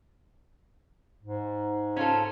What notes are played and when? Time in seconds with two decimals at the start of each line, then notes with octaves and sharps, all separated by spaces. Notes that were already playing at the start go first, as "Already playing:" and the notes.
1.23 G#2
1.96 C#4 F4 A4